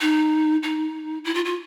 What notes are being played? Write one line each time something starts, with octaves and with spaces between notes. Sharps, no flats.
D#4
D#4
E4
F4
F4